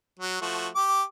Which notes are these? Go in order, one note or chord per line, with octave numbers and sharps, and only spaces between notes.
F#3
F3 A3 F#4
G4 D6